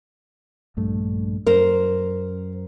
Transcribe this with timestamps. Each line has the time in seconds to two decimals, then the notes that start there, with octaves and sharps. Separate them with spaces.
0.77 A#1 G2 A3
1.46 F#2 A#4 C5